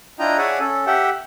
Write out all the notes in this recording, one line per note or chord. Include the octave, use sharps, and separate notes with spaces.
D4 E4 F4 D#5 G5 A#5
G#4 C#5 D5 E5 F#5 G#5
C#4 A4
G4 E5 F#5 G5